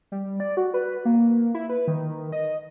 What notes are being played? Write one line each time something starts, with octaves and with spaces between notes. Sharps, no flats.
G3
D5
F#4
B4
A#3
E4
B4
D#3
D#5